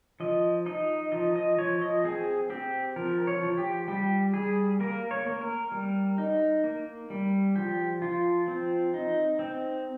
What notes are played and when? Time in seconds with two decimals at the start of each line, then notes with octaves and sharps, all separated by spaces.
0.20 F3 D#5
0.66 D#4 D#5
1.12 F3 D#5
1.36 D#5
1.58 F3 C#5
1.82 D#5
2.04 C4 G#4
2.50 C4 G4
2.96 F3 A#4
3.27 C#5
3.42 F3
3.58 G4
3.88 G3 G4
4.34 G3 G#4
4.80 A#3 A#4
5.11 C#5
5.26 A#3
5.41 A#4
5.72 G3
6.18 D#4
6.64 A#3
7.10 G3
7.56 F3 G4
8.02 F3 F4
8.48 C4
8.94 D#4
9.39 C4